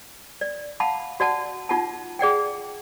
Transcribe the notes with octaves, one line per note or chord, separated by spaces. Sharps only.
D5
F5 F#5 A5 B5
F#4 D5 F#5 A5
D#4 F4 F#5 A5
G#4 D5 F#5 G5